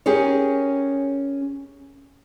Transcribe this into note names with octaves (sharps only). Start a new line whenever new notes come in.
C#4 G4 G#4 A#4 C#5